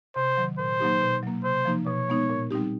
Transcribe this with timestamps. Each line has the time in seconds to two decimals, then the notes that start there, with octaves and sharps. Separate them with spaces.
0.16 C3 C5
0.37 D#3 F#3
0.59 A#2 C5
0.80 F#3 A#3 D#4 G4
1.01 B2
1.23 F#3 A#3
1.44 C3 C5
1.65 F3 A#3 D#4
1.87 B2 C#5
2.08 G#3 B3 D#4
2.30 A#2
2.51 G3 C4 D#4 G4